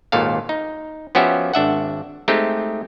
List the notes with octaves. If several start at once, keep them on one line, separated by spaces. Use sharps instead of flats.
G#1 D#2 A#2 A4 F5
D#4
F3 B3 C#4 F#4 G4 E5
G#1 D4 E5 F#5
G#3 A3 C4 D#4 G4